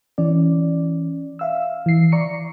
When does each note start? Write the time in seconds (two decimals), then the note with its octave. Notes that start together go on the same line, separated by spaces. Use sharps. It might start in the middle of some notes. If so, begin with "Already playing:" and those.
0.18 E3 C#4 D5
1.39 E5 F5 E6
1.86 E3 C7
2.12 D5 A#5 C#6 C#7